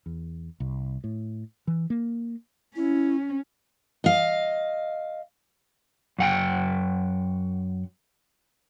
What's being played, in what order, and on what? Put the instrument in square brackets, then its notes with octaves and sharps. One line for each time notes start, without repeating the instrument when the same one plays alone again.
[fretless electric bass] E2
C2
A2
E3
A#3
[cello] C#4 [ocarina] E4
[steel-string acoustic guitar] D#5 F5
[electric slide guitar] F#2 F#5 G5